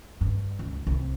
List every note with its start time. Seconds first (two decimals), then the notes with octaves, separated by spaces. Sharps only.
0.21 G2
0.59 C#2
0.87 C2